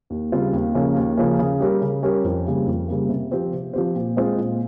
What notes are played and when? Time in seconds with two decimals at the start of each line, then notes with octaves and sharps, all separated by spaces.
0.10 D#2
0.32 C#3 G3 C4 F4
0.53 D#2
0.74 C#3 F3 A#3 C#4
0.96 D#2
1.17 C#3 F3 A#3 C#4
1.39 C#3
1.60 G3 C#4 G4 A#4
1.81 C#3
2.02 G3 C#4 G4 A#4
2.24 F2
2.46 C#3 G3 A#3
2.67 F2
2.88 C#3 G3 A#3
3.09 C3
3.31 F3 C4 G4 C5
3.53 C3
3.73 F3 C4 G4 C5
3.95 A#2
4.17 G#3 C4 F4 C5
4.38 A#2